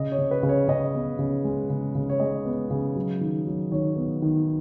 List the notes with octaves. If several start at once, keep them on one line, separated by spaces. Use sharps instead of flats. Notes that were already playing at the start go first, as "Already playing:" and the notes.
Already playing: C#3 D#5
C#5
C#3
B4
C#3
C#5
C#3 D#5
B3
C#3
G#3
C#3
C#3
C#5
G#3 D#5
B3
C#3
F#3
D#3
F#3
D#3 C#5
B3
D#3